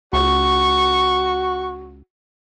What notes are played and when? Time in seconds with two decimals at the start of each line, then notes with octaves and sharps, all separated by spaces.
0.13 C#2 F#4 C#6